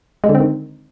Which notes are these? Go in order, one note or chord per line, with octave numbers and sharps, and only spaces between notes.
G#3
D3
C4
D#3